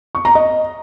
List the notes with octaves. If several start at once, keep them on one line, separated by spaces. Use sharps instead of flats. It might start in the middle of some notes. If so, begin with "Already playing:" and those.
C#6
A#5
D#5